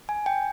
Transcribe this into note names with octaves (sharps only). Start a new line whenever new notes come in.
G#5
G5